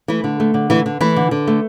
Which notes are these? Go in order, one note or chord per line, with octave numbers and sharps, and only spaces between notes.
E3 A3 E4
D3
A3
D3
E3 A3 E4
D3
E3 A3 E4
D3
D3
A3